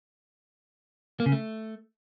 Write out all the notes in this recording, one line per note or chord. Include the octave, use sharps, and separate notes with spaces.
A#3
C#3
A3